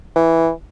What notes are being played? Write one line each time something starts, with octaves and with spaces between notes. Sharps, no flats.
E3